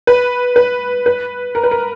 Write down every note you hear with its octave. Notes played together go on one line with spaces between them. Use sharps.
B4
B4
B4
A#4
B4
A#4